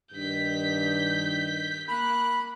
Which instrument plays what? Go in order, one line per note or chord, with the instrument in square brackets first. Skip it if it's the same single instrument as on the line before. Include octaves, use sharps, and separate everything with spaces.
[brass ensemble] G2 D#3 [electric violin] G6 B6
[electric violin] A#3 F#6 [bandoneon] B5